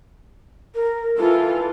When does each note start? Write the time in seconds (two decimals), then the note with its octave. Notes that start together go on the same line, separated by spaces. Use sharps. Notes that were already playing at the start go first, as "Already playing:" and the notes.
0.74 A#4
1.17 E3 F4 A4